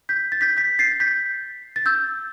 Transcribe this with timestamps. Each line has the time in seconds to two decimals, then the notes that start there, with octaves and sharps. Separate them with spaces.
0.09 G6 B6
0.32 A6
0.41 G6 B6
0.57 G6 B6
0.79 A6 C7
1.00 G6 B6
1.76 A6
1.86 E6 G6